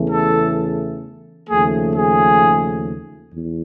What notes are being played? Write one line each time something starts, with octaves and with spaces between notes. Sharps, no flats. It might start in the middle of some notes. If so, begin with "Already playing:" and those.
Already playing: E2 C#3 E3 A3
A4
D#2 C#3 F3 A3 G#4
G#4
E2